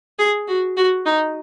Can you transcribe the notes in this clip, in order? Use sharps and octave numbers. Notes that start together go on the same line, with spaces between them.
G#4
F#4
F#4
D#4